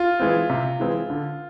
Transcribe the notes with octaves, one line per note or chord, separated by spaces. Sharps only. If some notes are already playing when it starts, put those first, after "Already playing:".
Already playing: F4
E3 G#3 C4
C3
E3 G#3 C4
D3